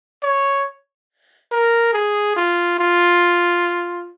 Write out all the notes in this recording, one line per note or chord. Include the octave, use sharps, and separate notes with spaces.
C#5
A#4
G#4
F4
F4